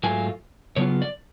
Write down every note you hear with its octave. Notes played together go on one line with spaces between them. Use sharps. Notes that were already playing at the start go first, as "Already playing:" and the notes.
G#2 F#3 A3 F4 G#5
C#3 F#3 B3 F4 C#5
D5